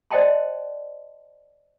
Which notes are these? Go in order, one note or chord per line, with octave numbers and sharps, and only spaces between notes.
C5 D5 D#5 G5 A5 C6